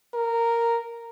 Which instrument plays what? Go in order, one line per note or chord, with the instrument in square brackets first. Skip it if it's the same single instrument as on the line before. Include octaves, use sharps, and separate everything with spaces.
[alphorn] A#4